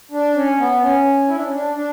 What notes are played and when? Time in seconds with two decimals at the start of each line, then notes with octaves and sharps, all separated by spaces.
0.11 D4
0.35 C#4
0.58 B3
0.81 C#4
1.28 E4
1.36 D4
1.44 C#4
1.53 D4
1.74 D4